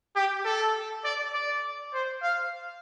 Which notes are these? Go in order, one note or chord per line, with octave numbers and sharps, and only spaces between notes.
G4
A4
D5
D5
C5
F5